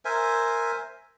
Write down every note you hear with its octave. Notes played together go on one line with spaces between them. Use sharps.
A#4 C5 E5 G#5